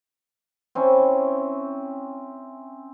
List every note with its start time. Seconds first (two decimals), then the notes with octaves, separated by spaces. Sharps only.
0.75 C4 C#4 E4